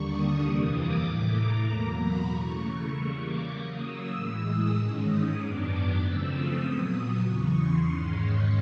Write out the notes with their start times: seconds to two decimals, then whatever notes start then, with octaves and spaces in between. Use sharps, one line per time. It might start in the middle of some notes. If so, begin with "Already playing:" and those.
Already playing: D#2 D3 G3 A#3 D4 C#6
0.08 D#6
0.40 F2 C3 E3 G3 A#3 D#6
0.71 D6
1.01 A2 E3 A3
1.33 A#5
1.64 E2 B2 F#3 A#3
1.95 B5
2.26 C#3 E3 A3 C#6
2.57 C#6
2.89 C#3 E3 G3 A#3
3.20 D6
3.50 C#3 F#3 A#3 D#6
3.82 E6
4.13 A2 E3 G#3 E6
4.44 D#6
4.75 G#2 D#3 G#3 C#4
5.06 D#6
5.37 F#2 D#3 F#3 B3 D4 D6
5.99 C#3 F3 A3 C4 E6
6.31 D#6
6.62 A#2 F#3 B3
6.93 D#6
7.23 E2 C#3 E3 C#6
7.55 C6
7.86 G#2 D#3 G#3 C#4
8.17 C#6